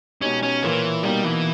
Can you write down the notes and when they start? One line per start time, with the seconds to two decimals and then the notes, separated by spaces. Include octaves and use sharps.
0.22 B2 G#3 C#4 D#4 G4
0.43 C#4
0.63 A#2 E3 A#3 E4 A#4 C#5
1.03 B2 G3 A#3 D#4
1.25 E3